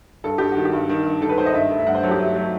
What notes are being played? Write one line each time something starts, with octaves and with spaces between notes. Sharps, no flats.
G2 A4
G2 G4
F#4
D#3
G4
G2
D#3
G2
D#3 A4
B4
D#3 C5
D#5
G2 E5
A3
E5
G2 F#5
C5
F#3 A4
G4
A3
F#3